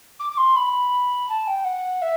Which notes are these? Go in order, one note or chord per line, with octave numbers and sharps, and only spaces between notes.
D6
D6
C6
B5
A5
G5
F#5
E5